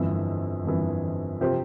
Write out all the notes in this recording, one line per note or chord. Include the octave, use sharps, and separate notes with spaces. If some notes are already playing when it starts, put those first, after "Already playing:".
Already playing: G1 F2 E3
G1 F2 E3
C3 F3 C4 G4 C5